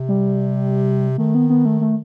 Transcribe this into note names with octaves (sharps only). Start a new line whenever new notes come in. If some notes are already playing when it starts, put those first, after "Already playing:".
Already playing: C3
G3
D#3 A3
B3
B3
A3
A3